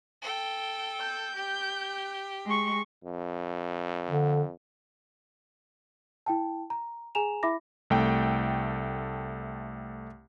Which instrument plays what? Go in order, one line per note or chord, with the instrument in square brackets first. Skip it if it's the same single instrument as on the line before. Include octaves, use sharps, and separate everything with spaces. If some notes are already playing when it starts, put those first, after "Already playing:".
[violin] A4 G5
[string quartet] G6
[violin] G4
[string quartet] G#3 C#6
[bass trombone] F2
[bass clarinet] D3
[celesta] E4 G5 A5
A#5
G#4 G#5 A#5 E7 F7
E4 E5 B5 D6 A#6
[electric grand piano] C2 A3 G5